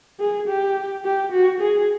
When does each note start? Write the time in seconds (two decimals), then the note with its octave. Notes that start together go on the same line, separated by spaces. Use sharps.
0.20 G#4
0.48 G4
1.05 G4
1.32 F#4
1.61 G#4